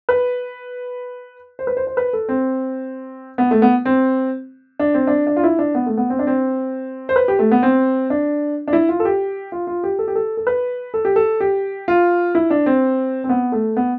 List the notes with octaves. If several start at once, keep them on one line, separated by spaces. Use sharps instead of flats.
B4
C5
B4
C5
C5
B4
A4
C4
B3
A3
B3
C4
D4
C4
D4
D4
F4
E4
D4
B3
A3
B3
C4
D4
C4
C5
B4
G4
A3
B3
C4
D4
D4
E4
F4
A4
G4
F4
F4
G4
A4
G4
A4
A4
B4
A4
G4
A4
G4
F4
E4
D4
C4
C4
B3
A3
B3